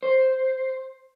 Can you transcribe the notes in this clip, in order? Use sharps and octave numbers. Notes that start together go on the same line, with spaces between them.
C5